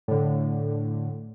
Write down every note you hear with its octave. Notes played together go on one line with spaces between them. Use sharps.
A2 D3